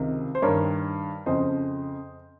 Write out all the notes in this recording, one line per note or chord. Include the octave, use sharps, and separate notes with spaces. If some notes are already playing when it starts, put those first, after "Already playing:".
Already playing: C#2 C3 D#3
C5
G2 A#4 C#5
D#3
F2 C#3 C5 D#5